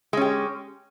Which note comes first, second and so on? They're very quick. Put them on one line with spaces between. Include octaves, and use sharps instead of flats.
G#3 C#4 G4